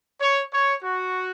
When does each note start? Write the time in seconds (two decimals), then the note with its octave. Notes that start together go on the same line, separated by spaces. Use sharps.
0.21 C#5
0.53 C#5
0.84 F#4